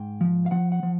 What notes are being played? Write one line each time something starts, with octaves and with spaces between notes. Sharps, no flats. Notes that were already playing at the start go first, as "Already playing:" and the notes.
Already playing: G#2 G5
F3
F5
F3 F#5
F#5
F3